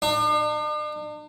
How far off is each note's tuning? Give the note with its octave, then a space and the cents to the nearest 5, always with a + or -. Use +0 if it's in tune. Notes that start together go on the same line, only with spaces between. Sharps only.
D4 +45